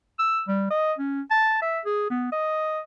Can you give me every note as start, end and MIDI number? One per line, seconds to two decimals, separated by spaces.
0.19 0.42 88
0.48 0.68 55
0.70 0.93 75
0.98 1.21 61
1.31 1.60 81
1.62 1.80 76
1.85 2.06 68
2.10 2.27 59
2.32 2.80 75